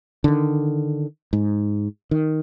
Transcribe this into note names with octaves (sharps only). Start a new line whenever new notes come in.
D3 D#3
G#2
D#3